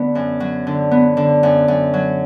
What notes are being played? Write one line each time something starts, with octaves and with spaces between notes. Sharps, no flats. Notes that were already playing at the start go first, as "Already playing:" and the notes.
Already playing: D3 B3
F#2
F#3
D3
B3
D3
F#2
F#2
F#3